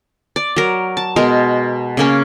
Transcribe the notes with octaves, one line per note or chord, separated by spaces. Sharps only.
D5
F#3 A#4
A5
B2 G#3 A#4
C#3 A#3 C#4